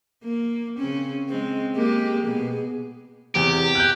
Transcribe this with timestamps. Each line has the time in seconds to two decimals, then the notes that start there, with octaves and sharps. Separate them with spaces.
0.23 A#3
0.78 C#3 C4 C#4
1.29 G#3 C4
1.75 G#3 A#3 G4
2.26 B2 G#4
3.35 E2 C3 G4
3.75 F#6 G6